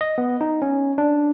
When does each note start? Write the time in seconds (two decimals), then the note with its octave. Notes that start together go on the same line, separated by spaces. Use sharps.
0.01 D#5
0.18 B3
0.41 D#4
0.62 C#4
0.98 D4